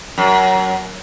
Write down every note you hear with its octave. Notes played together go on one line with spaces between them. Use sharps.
F#2